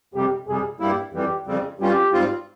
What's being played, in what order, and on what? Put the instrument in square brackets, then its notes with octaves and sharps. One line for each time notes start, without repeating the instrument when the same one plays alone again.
[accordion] F2 C3 G3 [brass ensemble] G4
[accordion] F2 C3 G3 [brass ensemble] G#4
[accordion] G2 G3 A#3 E4 [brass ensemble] G4
[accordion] F2 E3 G3 [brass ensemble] G4
[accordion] F2 C#3 G3 C4
[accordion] G2 G3 C#4 F4 [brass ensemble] G4
[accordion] G#2 G3 C4 F4